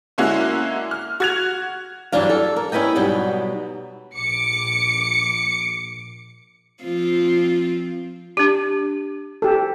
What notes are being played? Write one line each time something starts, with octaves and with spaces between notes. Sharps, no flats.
D3 G#3 A#3 C#4 E4 F#4
F6
F#4 G#6 F7
G2 E3 F#3 G3 D4 F5
A4
A#4
C#4 E4 B4 D#5 G5
G#2 B2 F#3 G3 B3 G5
A#1 D6 C#7
F3 C4 F4
D4 G4
G4 A4